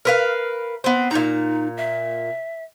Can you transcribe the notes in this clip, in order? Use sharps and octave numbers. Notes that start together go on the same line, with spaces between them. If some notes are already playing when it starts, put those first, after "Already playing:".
A#4 B4 F5
B3 C4
A#2 D#4 A#5
E5